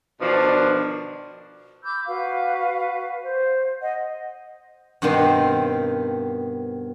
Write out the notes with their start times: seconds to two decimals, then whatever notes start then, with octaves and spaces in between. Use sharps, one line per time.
0.21 B2 D#3 F3 D4
1.83 B5 D6 E6 G6
2.06 F#4 B4 F5
3.21 C5
3.81 D#5 F#5
5.02 G2 B2 D#3 B3 C4 F4